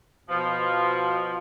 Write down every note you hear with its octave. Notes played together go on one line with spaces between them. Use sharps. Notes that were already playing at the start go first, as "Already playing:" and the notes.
B2 F3